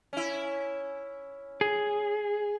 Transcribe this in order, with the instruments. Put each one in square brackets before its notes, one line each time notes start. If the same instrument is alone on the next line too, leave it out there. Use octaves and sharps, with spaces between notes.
[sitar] C#4 E4
[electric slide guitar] G#4